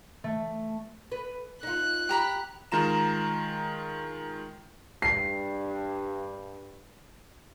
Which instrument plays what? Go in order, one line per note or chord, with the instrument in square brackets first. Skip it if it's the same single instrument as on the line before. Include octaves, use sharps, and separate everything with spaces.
[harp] A3
[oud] B4
[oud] D#4 F4 [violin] F#6
[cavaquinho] G4 A#5 B5
[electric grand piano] D#3 G#3 F4 A#5 E7
[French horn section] G2 [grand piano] C7